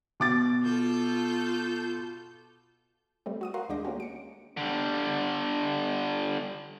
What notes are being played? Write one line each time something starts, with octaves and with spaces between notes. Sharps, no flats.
B2 D6 A6
F4 A4 G6
G3 A3 C4
F#4 D#6 D#7
A#4 F5 F#5 A#5 C6 C#6
D#2 G#3 D4 D6 G6 A#6
G#3 A#3 C#4 F#4 G4
C#7 D7
D3 G3